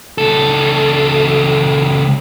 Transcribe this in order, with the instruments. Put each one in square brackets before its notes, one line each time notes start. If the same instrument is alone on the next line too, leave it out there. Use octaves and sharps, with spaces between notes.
[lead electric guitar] C#2 A4